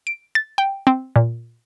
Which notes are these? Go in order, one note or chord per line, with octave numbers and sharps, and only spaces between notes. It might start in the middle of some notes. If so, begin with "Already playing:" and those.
D7
A6
G5
C4
A#2